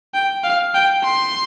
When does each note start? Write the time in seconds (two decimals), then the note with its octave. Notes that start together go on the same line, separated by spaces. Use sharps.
0.14 G5
0.43 F5
0.74 G5
1.03 C6